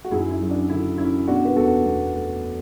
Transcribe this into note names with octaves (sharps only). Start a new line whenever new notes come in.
F#4
F#2 E4 G#4
E4
F#3
D4
D3 E4
C#4 E4
B2 D4 F#4
B4
E2 F#4 A4
E2
A3